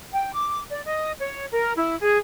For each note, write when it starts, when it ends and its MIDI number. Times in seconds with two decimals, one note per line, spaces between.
0.12 0.33 79
0.33 0.61 86
0.71 0.81 74
0.85 1.11 75
1.18 1.46 73
1.52 1.72 70
1.76 1.96 64
2.01 2.17 68